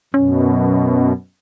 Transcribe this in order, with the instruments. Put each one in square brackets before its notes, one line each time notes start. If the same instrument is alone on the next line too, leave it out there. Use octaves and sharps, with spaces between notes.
[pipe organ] F#2 B2 [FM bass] C#4